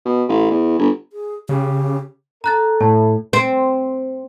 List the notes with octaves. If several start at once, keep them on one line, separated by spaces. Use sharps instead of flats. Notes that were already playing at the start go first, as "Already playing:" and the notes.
B2
A1
E2
G1
G#4
C#3 G4
A4 A#5 F#6 A6
A2 A5
C4